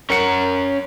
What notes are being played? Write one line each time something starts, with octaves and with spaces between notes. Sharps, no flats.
C#4 A#4 F#5 C#7